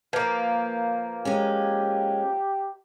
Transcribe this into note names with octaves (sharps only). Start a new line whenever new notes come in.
F3 A#3 B4 G6 G#6
G#3 C#4 G4